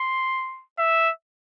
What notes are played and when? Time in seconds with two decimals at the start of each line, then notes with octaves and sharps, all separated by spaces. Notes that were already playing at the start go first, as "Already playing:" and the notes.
Already playing: C6
0.78 E5